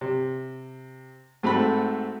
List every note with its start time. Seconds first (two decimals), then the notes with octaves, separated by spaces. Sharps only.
0.01 C3
1.43 G#2 A3 C4 F#4 B5